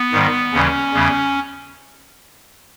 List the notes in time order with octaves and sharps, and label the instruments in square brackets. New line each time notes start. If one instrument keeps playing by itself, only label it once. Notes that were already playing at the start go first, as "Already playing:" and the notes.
Already playing: [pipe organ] B3
G#2 D#3 G3
D#2 C#3 E3 G3 C#4
E2 C#3 G3